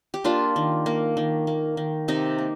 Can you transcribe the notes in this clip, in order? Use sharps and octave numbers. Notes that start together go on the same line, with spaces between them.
G4
A#3 D4 F4
D#3
A#3
D#3
A#3
D#3
C3 D#4 G4
A#3